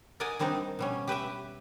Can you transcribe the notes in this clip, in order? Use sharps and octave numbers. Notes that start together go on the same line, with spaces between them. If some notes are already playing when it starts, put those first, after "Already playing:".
A#4 D5 D#5 F#5 G#5
D#3 G3 C4 D4 D#4
B2 G3 C#4
G4 B4 E5 G5